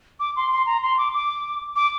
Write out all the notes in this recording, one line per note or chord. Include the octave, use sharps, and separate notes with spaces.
D6
C6
C6
A#5
C6
D6
D6
D6